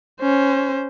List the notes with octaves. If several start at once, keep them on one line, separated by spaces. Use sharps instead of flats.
C#4 C5